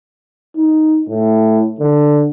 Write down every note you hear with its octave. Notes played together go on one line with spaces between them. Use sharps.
D#4
A2
D3